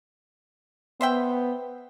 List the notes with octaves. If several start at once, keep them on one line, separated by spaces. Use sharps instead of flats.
B3 C5 E5 G5